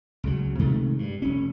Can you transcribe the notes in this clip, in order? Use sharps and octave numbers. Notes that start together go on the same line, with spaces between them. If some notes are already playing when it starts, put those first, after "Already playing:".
C#2 C#3 F#3
C3 D#3 G#3 A3
G2
F1 C#4